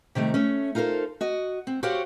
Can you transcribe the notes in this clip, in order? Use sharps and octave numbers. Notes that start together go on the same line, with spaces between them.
C3 D#3 G3 A3
A3 C#4
D#4 F4 A4 A#4 C5
F#4 D#5
C4
F#4 G4 C5 C#5 F5 F#5